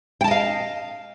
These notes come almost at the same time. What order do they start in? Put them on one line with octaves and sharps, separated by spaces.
G5 A5 D#5 F5